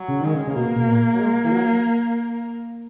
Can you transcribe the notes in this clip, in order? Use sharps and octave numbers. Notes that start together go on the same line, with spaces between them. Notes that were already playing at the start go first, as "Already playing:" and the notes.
Already playing: F#3
C#3
D#3 G#3
C#3
C#3
B2 A#3
B2
A#2
F#3
G#3
E3
F#3